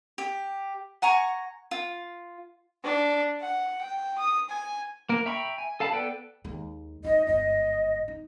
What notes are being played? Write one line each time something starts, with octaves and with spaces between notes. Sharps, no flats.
G4
F#5 G#5 A#5 C#6
F4
D4
F#5
G5
D#6
G#5
A#3 A#4
E5 G5 A#5 B5 C#6
G#5
A4 F5 A5 B5
B3 A4 B4 D5 G5
D#2 G#3
D#4 F4 D#5
G1 G#2 D#5
D#4